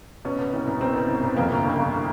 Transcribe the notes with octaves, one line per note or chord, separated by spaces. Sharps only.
B2 C#4
B2
C2
C2
B2 C4
B2
C2
C2
F2 A#3
G1
C#3
G1